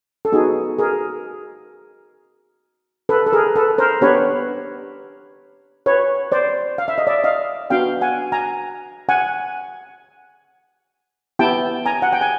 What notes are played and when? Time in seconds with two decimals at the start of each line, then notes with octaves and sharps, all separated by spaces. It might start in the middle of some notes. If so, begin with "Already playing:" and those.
0.25 A4
0.32 B3 D#4 F#4 G#4
0.79 G#4 A#4
3.09 A4 B4
3.26 A4
3.33 G#4 A#4
3.56 A4 B4
3.78 A#4 C5
4.01 B3 D4 G4 B4 C#5
5.86 B4 C#5
6.32 C5 D5
6.78 F5
6.88 E5
6.98 D#5
7.07 D5 E5
7.24 D#5 F5
7.70 B3 D4 F#4 F5 G5
8.01 F#5 G#5
8.32 G#5 A#5
9.09 F#5 G#5
11.39 B3 E4 G4 G5 A5
11.86 G#5 A#5
12.02 F#5
12.12 G5
12.21 G#5